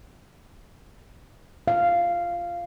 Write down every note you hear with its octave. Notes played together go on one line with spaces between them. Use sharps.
F5